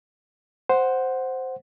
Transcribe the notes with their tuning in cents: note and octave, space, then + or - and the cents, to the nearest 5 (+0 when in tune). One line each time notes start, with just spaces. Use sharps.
C5 +0 F#5 +0